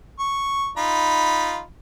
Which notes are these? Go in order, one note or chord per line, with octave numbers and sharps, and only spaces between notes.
C#6
D#4 F4 B5